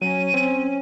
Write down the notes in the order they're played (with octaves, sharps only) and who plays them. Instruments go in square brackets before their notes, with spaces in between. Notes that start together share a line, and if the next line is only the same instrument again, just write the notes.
[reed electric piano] F#3 [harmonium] C#4 [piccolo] D#7
[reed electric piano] C4